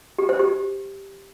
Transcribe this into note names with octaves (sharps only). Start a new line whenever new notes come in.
G4
C5
G4